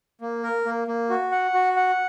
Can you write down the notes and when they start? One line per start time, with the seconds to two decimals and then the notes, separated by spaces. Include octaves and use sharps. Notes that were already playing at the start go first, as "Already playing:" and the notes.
0.21 A#3
0.43 A#4
0.65 A#3
0.88 A#3
1.10 F#4
1.31 F#5
1.54 F#4
1.76 F#5